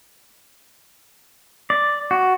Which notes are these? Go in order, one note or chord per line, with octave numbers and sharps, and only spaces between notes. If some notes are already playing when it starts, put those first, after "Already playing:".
D5
F#4